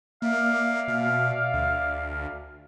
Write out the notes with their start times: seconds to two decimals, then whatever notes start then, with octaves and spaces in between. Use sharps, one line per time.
0.22 A#3 D5 E5 F5
0.88 B2
1.54 D2